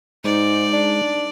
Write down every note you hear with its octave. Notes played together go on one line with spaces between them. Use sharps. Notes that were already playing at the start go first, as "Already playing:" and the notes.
G#2 G#3 D#4 D5
D4